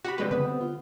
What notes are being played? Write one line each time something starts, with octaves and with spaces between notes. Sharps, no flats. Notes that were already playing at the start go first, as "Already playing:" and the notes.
F#4 G4 B5
F2 C3 G3 G#3 D4 B4
D3 B3 B4
C4
F4